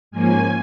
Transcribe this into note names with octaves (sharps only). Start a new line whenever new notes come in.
G#2 F3 A#3 C#4 G#5